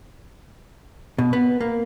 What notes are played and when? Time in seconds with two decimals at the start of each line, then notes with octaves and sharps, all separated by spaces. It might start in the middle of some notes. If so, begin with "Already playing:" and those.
1.18 B2
1.33 B3
1.61 A#3